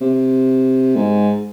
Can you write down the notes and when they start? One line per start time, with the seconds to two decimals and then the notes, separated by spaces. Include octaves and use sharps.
0.01 C3
0.96 G#2